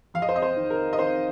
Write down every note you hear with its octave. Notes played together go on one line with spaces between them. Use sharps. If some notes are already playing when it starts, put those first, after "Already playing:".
F2 F5
D#5
C5
D#5
C5
D#3
A#4
D#5
D#3 C5